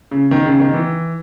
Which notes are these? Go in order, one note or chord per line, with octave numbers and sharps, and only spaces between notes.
C#3
D#3
C#3
D#3
E3